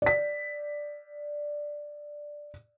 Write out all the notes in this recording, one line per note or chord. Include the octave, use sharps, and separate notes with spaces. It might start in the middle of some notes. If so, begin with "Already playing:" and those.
D5 B6